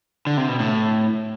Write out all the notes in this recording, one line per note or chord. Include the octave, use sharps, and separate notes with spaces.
D3
C3
B2
A2